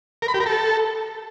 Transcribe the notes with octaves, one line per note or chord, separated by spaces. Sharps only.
A#4
B5
G4
A#4
A4